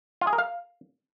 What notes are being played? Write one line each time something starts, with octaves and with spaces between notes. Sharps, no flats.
F4
G#4
A#4
F5